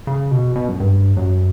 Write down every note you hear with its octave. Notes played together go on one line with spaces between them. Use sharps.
C#3
B2
B2
F#2
G2
F#2